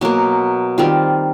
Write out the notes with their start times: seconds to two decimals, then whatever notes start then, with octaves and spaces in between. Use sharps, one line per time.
0.01 B2 F#3 A#3
0.78 D#3 G3 C4 F4